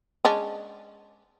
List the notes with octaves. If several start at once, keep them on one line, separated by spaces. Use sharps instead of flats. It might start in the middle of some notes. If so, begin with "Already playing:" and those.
G#3 C#4 D4